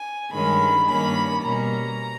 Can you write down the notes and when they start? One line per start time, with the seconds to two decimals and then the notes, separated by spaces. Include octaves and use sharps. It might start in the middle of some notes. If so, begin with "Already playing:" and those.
Already playing: G#5
0.32 G2 D#3 G#3 C#4 B5
0.86 G2 D#3 A#3 C#4 B5
1.41 B2 G3 A#3 C#4 A#5